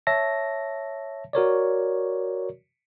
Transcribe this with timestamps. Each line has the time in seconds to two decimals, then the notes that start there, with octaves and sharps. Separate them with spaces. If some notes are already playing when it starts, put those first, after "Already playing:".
0.07 C#5 E5 A5 A#6
1.33 F#4 A#4 C#5 D5